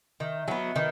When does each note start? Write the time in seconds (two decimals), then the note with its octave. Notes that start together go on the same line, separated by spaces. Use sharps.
0.20 D#3 E5
0.39 D#5
0.48 F#3 B3
0.76 D#3 B4